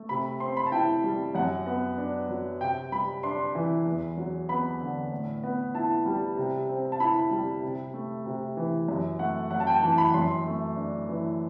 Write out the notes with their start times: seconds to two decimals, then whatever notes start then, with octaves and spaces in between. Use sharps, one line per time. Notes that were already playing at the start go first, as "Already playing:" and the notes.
Already playing: A3
0.09 C3 B5
0.40 C4 C6
0.57 B5
0.66 A5
0.72 E4 G5
1.04 G3
1.35 F#2 F#5
1.66 B3
1.98 D4
2.29 F#3
2.60 C3 G5
2.92 G3 B5
3.23 D4 C6
3.55 E3
3.86 E2
4.17 F#3
4.49 B3 B5
4.80 D3
5.12 A2
5.43 B3
5.74 E4 A5
6.06 G3
6.37 C3
6.69 C4
6.92 A5
7.00 E4 B5
7.31 G3
7.63 C3
7.94 A3
8.26 C3
8.57 E3
8.88 F#2
9.19 A3 F#5
9.51 F#2 F#5
9.60 A5
9.67 G5
9.83 E3 A5
9.98 B5
10.14 F#2 C6
10.46 A3
10.76 D4
11.08 E3